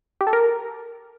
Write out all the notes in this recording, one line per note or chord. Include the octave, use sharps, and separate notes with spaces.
G4
A4
A#4